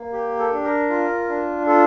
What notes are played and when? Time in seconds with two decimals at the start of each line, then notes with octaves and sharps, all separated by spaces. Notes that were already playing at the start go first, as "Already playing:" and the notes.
Already playing: A#3
0.13 G4
0.39 A4
0.52 D4
0.64 A#4
0.90 F4
1.28 D4
1.67 F4 A4